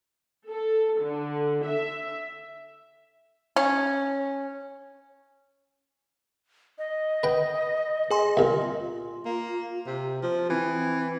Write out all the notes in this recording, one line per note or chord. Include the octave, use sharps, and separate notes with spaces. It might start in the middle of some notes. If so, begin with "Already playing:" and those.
A4
D3
E5
C#4
D#5
B4 G5
G#4 G#5 C6
C2 A#2
F4
A#3
C3
F3 C5
E3 C4